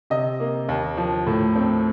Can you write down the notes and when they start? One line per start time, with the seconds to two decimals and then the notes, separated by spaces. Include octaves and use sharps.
0.10 C3 D#5
0.40 A#3
0.69 D#2
0.97 F3
1.27 A2
1.55 C4